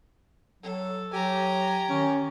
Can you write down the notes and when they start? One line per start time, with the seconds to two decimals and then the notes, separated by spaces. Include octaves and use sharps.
0.63 F#3 A4
1.13 F#3 G4 G#5 A#5
1.89 D#3 C#4